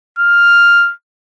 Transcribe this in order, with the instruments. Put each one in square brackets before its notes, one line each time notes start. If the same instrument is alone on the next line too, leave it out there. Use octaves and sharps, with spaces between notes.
[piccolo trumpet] F6